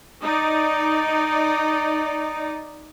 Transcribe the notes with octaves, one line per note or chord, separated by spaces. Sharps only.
D#4 D5